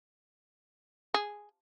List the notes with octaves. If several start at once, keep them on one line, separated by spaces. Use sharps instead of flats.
G#4